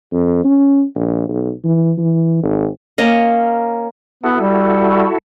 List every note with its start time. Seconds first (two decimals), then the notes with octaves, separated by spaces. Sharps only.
0.12 F2
0.44 C#4
0.95 A#1
1.29 B1
1.64 E3
1.98 E3
2.43 G#1
2.98 A#3 C#4 C#5 D#5
4.24 B3 E4 F#4 A4
4.41 G3